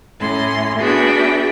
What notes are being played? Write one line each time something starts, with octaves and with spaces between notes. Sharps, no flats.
A2 C#4 C6
B3 D4 F#4 G#4 E5 G5